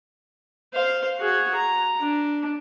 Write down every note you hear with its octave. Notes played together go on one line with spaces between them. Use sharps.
C5 F5
F#4 G#4
A#5
D4